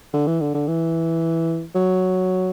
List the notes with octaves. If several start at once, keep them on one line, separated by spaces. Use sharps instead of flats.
D3
E3
D3
D3
E3
F#3